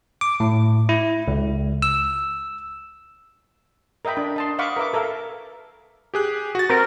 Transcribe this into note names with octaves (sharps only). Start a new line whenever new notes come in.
D6
A2
E4
C#2
E6
A#4 D#5 E5 G5 B5
D4
D#5 A5 C6
D#5 F5 F#5 B5 C#6 D6
A#4 B4 E5 D6
A4 A#4 E5 F5
G4 G#4 F#6
F#4 A6
C4 A#4